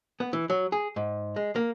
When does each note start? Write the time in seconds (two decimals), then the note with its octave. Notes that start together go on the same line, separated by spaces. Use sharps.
0.20 B3
0.33 E3
0.50 F#3
0.72 G#4
0.96 G#2
1.36 G#3
1.56 A#3